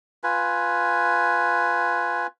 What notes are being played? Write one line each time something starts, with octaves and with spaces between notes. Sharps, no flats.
F4 B4 G#5